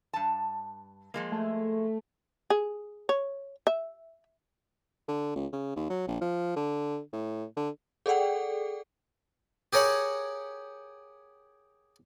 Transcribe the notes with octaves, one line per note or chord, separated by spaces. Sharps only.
G2 A5
F3 G#3 A#3
A3
G#4
C#5
E5
D3
C#2
C#3
D#2
F#3
A#1
F3
D3
A2
D3
G#4 A4 D5 F#5 G5
G4 G#4 A#4 C#5 F#5